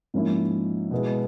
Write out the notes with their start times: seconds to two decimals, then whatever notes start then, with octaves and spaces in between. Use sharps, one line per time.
0.14 G#2 F3 A#3 C#4 E4
0.91 B2 G#3 B3 E4